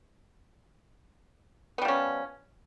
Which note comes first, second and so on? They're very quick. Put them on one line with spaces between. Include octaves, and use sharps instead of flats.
B3 G3 F3 C#4